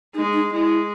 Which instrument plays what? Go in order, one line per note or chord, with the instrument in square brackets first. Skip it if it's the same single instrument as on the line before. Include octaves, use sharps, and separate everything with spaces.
[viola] G#3 [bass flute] D#4
[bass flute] D#4
[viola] G#3 [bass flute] E4